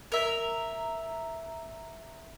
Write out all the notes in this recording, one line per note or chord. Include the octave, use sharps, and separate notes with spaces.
A#4 E5